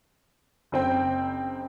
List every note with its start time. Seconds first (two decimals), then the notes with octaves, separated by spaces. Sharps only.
0.72 F#1 C4 G5